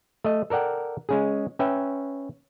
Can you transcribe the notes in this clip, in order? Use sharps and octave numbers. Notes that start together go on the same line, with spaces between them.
A3 D#5
A4 A#4 D5 F#5 G5
G#3 C#4 G#4
C#4 B4 E5 G5